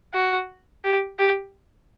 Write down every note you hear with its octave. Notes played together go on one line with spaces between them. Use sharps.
F#4
G4
G4